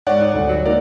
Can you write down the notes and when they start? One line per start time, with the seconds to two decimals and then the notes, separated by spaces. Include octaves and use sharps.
0.07 G#2 C#5 D5 F#5
0.21 D#4
0.33 D2 G3
0.48 F#3
0.66 A#3 D#4 A#4 D5